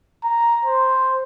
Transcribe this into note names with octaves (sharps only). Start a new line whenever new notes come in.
A#5
C5